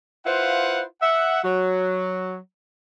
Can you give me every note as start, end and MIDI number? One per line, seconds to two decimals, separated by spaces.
0.26 0.83 64
0.26 0.83 65
0.26 0.83 71
0.26 0.83 72
0.26 0.83 77
0.26 0.83 78
1.02 1.40 76
1.02 1.40 78
1.44 2.37 54